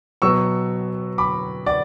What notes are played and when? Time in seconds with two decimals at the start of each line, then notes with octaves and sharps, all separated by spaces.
0.22 B2 F#3 B3 C#6 E6
1.18 B5 D6
1.66 D5 F#5